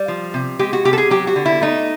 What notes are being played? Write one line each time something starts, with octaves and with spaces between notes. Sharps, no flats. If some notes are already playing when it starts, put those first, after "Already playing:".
Already playing: G3
F3
C3
G#3 G4
F#4
C3 G4
A4
G#4
F#3 G4
F#4
D3
E4
A3 D#4